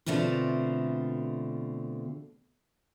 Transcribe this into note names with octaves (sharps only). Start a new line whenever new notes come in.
B2 D3 A3 C4 F4